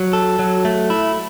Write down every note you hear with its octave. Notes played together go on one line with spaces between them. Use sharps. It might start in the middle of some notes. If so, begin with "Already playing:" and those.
Already playing: F#3
A4
F#3
A3
E4